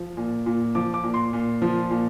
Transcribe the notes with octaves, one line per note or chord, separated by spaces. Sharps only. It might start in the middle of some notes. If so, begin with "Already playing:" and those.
Already playing: F3
A#2
A#2
F3 D6
D6
A#2
C6
A#2
F3
A#2